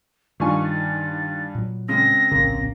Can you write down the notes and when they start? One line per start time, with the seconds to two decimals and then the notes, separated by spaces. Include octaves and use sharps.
0.40 G2 D#3 F4 G#5 C#6
0.64 A6
1.55 A#2 F#3
1.88 C#3 G#3 C4 A#6
2.31 D1 A#1 C#3 A#3